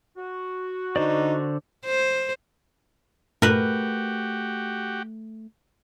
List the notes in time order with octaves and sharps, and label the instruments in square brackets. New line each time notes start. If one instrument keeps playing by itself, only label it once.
[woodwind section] F#4
[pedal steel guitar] D3 C5 D5 [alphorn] D#4
[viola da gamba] C5
[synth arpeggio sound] G2 A#2 [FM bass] A3 [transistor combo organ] F#4 G4 [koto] A#4 B4